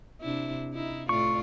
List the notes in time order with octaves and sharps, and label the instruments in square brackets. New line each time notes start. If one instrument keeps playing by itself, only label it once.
[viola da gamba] C3 D4 E4
D#4 E4
[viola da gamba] A2 F4 D5 [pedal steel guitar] C#6